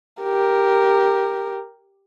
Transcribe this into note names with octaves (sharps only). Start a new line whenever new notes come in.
G4 A#4